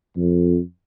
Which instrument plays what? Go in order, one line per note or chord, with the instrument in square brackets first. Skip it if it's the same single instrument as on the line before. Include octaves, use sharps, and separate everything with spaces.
[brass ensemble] F2